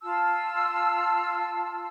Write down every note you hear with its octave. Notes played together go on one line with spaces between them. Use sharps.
F4 A5 E6